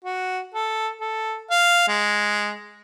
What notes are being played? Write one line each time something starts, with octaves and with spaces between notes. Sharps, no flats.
F#4
A4
A4
F5
G#3